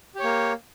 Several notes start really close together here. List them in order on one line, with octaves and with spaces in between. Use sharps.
G4 C#5 A#3